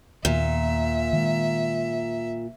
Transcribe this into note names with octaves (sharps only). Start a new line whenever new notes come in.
D#2 A#2 D#3 B3 E5
D#3 G#3